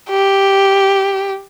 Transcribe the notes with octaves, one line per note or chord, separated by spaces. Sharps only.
G4